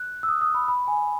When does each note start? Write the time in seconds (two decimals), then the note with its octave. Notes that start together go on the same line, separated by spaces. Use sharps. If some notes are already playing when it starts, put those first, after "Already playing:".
Already playing: F#6
0.23 E6
0.28 D#6
0.41 D#6
0.54 B5
0.68 B5
0.88 G#5